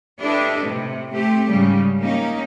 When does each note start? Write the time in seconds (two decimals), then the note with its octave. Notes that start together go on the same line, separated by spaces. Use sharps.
0.20 D4 E4 G4 A4 B4 D#5
0.65 A2 C3
1.13 A3 C4 G4
1.49 G#2 C#3 G3
1.99 A#3 C#4 D#4 G4